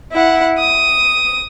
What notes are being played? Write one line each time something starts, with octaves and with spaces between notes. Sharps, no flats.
E4 F#5
D#6